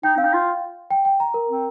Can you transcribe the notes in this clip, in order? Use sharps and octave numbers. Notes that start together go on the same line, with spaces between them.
D#4 G5
C4 F5
D#4
F4
G5
G5
A#5
A#4
C4